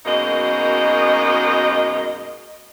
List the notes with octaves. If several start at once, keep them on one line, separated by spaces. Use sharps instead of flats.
F#2 B2 G#3 A#3 D#4 D#5